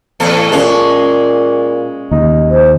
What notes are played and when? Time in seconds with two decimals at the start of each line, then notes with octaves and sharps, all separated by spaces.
0.20 E2 A2 A4
0.52 A#2 G#3 C#4
2.11 D#2 D#4
2.50 C5